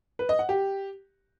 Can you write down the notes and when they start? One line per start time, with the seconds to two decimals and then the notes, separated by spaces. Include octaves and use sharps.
0.19 B4
0.29 D#5
0.39 F#5
0.49 G4